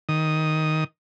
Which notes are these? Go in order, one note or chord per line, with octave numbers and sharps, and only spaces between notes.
D#3 D#6